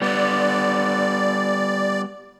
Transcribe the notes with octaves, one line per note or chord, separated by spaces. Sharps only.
G3 B3 D5